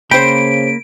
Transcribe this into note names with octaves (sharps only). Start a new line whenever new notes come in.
C#3 A#3 C5 G5 B5 D7